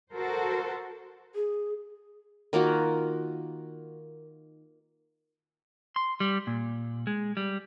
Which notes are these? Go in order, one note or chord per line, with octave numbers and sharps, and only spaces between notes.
F#4 A4 A#4 C5
G#4
D#3 A#3 F4 F#4
C6
G3
A#2
G#3
G3